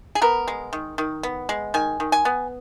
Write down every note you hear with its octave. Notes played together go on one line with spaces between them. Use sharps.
G#4
B3 A#4
G#3
D#3
D#3
B3
G#3
D#3 G#5
D#3
G#5
B3